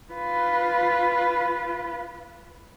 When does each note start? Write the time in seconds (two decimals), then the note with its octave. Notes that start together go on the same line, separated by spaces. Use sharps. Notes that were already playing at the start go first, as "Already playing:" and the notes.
0.14 F4 B4